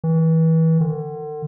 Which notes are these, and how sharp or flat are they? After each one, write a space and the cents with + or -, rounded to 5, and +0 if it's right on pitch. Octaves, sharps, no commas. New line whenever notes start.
E3 -30
D3 +40